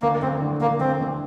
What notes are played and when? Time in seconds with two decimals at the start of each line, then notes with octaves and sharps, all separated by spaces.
0.02 D2 A#3
0.22 D2 C4
0.42 D3
0.61 D3 A#3
0.80 D2 C4
1.01 D2